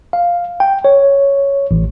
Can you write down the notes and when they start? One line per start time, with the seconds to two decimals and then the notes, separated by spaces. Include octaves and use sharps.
0.13 F5
0.60 G5
0.85 C#5
1.71 A1